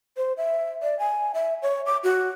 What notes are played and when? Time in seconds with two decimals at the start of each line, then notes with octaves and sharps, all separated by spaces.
0.17 C5
0.37 E5
0.82 D5
0.99 G#5
1.34 E5
1.62 C#5
1.86 D6
2.04 F#4